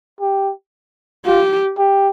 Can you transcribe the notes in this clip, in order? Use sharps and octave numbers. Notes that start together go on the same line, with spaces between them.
G4
F4 G4
G4